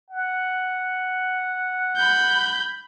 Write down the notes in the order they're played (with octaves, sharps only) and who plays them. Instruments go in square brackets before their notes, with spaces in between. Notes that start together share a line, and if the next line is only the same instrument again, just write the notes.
[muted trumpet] F#5
[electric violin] B5 G6